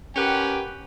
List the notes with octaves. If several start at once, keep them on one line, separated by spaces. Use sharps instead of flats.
C#4 G4 A#4 B4 F#5 G5